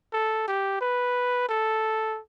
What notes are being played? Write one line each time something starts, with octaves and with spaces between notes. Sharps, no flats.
A4
G4
B4
A4